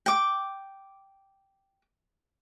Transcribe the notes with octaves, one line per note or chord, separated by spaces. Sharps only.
G5 D6